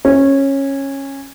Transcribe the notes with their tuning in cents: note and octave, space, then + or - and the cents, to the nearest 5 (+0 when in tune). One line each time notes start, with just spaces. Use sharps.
C#4 -15